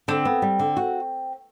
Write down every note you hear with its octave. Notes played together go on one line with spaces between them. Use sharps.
D3 C4
B3
G3
D3
F#4